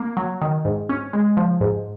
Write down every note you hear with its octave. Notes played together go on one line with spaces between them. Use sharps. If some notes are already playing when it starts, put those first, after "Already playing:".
Already playing: A#3
F#3
D#3
G#2
C#4
G#3
F3
G#2